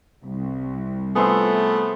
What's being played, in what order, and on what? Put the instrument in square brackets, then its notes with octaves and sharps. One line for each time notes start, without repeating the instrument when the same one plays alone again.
[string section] C2
[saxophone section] A3 B3 [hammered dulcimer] G#4 C5 E5